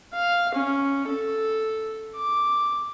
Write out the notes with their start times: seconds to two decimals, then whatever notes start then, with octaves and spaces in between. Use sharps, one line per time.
0.13 F5
0.54 C#4
1.07 A4
2.15 D6